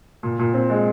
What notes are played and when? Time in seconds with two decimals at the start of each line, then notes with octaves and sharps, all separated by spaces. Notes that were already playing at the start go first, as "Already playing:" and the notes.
0.23 A#2
0.39 A#2
0.54 C4
0.70 G#3